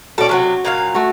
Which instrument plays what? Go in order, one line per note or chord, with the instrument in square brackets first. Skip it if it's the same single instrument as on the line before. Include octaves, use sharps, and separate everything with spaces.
[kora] B2 C#4 [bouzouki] A4 D5
[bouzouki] C3 F#3 [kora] C#4 F#4
[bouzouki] A#2 F#3 F5
[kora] A3 F#4